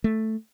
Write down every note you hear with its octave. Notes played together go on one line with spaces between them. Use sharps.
A3